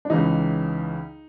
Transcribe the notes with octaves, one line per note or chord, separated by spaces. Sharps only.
D4
C#2 C#3 E3 D#4